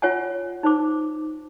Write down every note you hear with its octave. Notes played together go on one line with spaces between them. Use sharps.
F4 C#5 F#5 G#5
D#4 C5 D6